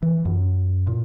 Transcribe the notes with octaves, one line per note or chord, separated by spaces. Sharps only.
E3
F#2
A#2